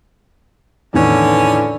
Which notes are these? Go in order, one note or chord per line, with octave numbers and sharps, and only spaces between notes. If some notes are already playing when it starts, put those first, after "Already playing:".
E2 A2 D3 D#3 C#4 B4